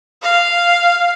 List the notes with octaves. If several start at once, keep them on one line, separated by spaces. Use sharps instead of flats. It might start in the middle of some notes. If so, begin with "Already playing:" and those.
F5